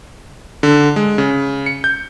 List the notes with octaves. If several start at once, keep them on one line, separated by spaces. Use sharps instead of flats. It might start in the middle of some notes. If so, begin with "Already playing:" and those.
D3
G#3
C#3
C#7
G6